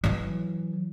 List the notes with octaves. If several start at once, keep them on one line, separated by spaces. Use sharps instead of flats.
E3 F#3